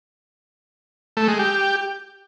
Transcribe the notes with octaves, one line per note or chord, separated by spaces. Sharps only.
A3
G#3
G4